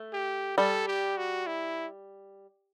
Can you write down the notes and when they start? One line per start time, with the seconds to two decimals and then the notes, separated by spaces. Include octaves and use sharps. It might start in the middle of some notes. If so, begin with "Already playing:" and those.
Already playing: A3
0.13 G4
0.57 G3 A4
0.88 G4
1.17 F#4
1.47 E4